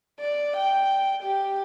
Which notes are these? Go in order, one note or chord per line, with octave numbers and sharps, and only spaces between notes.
D5
G5
G4